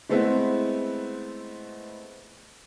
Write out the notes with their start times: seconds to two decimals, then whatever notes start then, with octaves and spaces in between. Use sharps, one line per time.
0.09 G#3 A3 B3 C4 E4